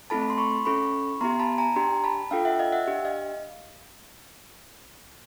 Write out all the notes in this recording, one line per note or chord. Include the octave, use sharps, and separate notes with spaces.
A3 C4 E4 A4 A5 B5
B5
C6
B5 C#6
C#4 E4 A4 B5 C#6
B3 E4 G4 A#5 C6
A5 B5
G#5 A#5
D4 G4 A#5 C6
A5 B5
D4 F4 A4 F5 G5
E5 F#5
D#5 F5
E5 F#5
D4 G4
D#5 F5